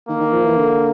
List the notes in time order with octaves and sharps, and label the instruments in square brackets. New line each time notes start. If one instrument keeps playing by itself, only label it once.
[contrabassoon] D#3 [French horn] A#3
[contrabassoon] D#3
F3
E3
D3